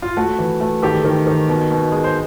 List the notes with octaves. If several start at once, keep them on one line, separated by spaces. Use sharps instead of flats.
F4
A3 F#4
E3
A3
D#3 G4 A4
D#3
D#3
B2
B2
G#3
C5